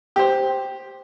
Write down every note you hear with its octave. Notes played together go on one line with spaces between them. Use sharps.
G4 C5